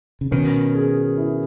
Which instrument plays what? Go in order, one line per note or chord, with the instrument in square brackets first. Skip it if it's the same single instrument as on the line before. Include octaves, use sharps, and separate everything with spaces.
[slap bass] C#3
[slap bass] B2 D#3 [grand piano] C#4
[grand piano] G#4
E4